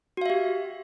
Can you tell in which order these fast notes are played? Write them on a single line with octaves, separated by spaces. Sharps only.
F#4 F5 E5 G4